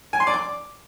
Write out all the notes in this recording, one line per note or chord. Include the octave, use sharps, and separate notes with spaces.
G#5
C6
D5
D6